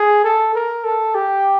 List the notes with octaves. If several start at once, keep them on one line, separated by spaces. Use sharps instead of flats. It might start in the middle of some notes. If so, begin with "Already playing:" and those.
Already playing: G#4
A4
A#4
A4
G4